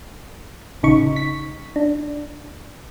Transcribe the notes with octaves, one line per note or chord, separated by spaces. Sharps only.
A1 C#3 D#4 C#6
B6
D4